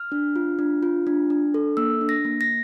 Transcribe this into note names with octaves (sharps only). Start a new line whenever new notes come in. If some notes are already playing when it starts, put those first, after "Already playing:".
Already playing: F6
D4
F4
D4
F4
D4
D4
A4
A#3 E6
D4
A#6
A#3
A#6